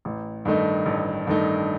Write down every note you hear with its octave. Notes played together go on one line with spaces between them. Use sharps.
A1
G2 D#3 A3 D#4
A1
G2 D#3 A3 D#4